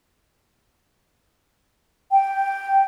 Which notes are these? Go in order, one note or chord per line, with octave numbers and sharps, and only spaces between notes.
G5